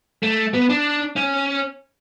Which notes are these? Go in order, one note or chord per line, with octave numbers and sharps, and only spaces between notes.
A3
B3
D4
C#4